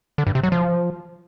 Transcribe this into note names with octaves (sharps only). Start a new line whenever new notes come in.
D3
G2
C3
F#3
F3